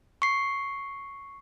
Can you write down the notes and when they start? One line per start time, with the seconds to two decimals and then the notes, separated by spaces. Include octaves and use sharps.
0.22 C#6 C7